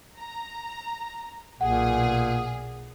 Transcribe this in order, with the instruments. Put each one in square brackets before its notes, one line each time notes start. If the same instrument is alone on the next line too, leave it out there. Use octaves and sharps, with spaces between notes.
[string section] A#5
[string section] B1 G#4 [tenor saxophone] A#2 [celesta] F#5